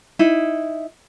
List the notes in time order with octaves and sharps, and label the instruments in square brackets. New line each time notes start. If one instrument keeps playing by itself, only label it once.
[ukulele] D#4 E4